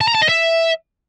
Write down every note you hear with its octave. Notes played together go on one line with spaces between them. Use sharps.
A5
A#5
A5
D#5
E5